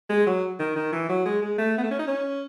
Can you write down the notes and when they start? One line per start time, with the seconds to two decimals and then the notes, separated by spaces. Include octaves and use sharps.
0.09 G#3
0.27 F#3
0.60 D#3
0.76 D#3
0.92 E3
1.09 F#3
1.25 G#3
1.42 G#3
1.58 A3
1.78 B3
1.83 A3
1.91 C#4
1.99 D#4
2.07 C#4